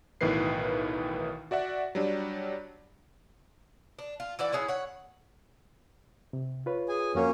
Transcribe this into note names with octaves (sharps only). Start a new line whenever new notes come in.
B1 A2 D#3 E3 B4 C7
F#4 D5 E5 F#5
F#3 G3 D4
D4
F4
E3 E4 D5 F#5
C#4 E4 G#4 F#5
C#5 F#5
C3
F4 B4 C#5
G#4 G#5
F2 A#3 C#4 F#4 C#5